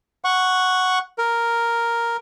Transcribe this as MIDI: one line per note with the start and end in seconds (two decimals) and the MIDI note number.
0.24 0.99 78
0.24 0.99 85
1.18 2.17 70